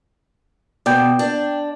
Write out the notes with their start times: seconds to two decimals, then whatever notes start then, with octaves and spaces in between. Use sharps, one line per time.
0.86 B2 D5 G5
1.19 D4